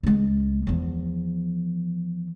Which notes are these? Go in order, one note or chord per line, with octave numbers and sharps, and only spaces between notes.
C#2 G#3
E2 F3